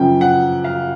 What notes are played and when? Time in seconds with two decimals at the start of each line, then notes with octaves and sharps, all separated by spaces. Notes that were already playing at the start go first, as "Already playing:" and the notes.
Already playing: F#2 C#3 F3 G5
0.21 F#5
0.64 F5